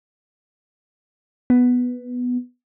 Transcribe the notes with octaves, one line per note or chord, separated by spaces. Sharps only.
B3